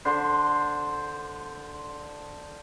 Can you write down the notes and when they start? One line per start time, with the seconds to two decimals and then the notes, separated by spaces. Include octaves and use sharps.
0.05 D3 C5 C6